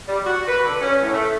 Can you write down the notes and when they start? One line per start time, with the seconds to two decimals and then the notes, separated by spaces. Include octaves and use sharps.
0.08 G3
0.25 F#4
0.48 B4
0.64 D3
0.81 C#4
1.01 A2
1.13 A3